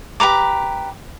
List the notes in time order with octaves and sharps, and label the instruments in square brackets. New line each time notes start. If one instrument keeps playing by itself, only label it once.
[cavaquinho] G4 B4 A#5 D6